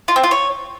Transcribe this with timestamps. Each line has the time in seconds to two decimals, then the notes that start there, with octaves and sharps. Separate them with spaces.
0.08 F4
0.16 C4
0.23 F4
0.31 C#5